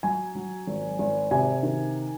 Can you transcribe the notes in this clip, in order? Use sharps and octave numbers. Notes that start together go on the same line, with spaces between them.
F#3 G#5
F#3
G#1
G#1
C3 G#5
D#3